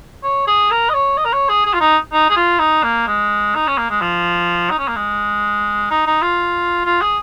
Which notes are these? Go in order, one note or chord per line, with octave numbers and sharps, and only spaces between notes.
C#5
G#4
A#4
D#5
C#5
D#5
A#4
C#5
G#4
G#4
F4
D#4
D#4
G#4
F4
D#4
A#3
G#3
D#4
C#4
A#3
G#3
F3
D#4
C#4
A#3
G#3
D#4
D#4
F4
F4
G#4